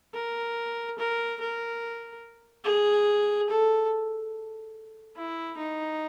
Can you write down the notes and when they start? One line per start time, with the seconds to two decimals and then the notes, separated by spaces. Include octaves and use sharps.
0.14 A#4
0.98 A#4
1.40 A#4
2.65 G#4
3.49 A4
5.16 E4
5.58 D#4